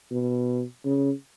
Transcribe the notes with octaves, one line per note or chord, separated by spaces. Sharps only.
B2
C#3